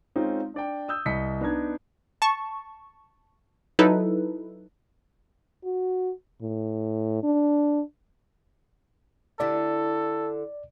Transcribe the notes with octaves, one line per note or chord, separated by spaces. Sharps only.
G#3 C4 C#4 D#4 F4
D4 D5 G5
D#6 E6 G6
C2 D#5 B5 B6 C#7
B3 D4 D#4 A#5 G#6
A5 C#6
F#3 D#4 E4 A4 B4
F#4
A2
D4
D3 E4 G4 A4 D5